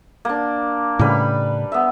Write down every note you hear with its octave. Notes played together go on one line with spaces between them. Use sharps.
A#3 D4
A2 C#3 G3 B4
B3 E5